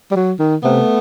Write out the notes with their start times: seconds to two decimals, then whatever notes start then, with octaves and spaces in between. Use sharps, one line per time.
0.11 G3
0.16 F#3
0.39 D#3
0.63 C3 A3 B3